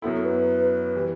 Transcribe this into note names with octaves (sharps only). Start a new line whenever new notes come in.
F#2 F#3 B3 E4 A4
A4
B4
E3 G3